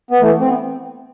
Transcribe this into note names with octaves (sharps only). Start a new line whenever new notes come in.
B3
E3 A3
C4
B3